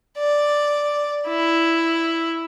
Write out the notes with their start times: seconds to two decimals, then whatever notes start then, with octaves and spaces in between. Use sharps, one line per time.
0.18 D5
1.27 E4